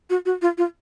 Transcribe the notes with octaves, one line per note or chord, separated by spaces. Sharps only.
F#4
F#4
F4
F4